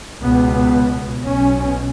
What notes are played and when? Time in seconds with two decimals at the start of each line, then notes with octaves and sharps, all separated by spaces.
0.22 C#2 B2 B3
1.27 B1 B2 C#4